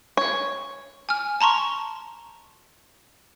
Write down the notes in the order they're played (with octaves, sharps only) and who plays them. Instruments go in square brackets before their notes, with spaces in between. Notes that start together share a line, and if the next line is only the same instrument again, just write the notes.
[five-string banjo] C#5
[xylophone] G#5 F6
A5 A#5 C6 C#6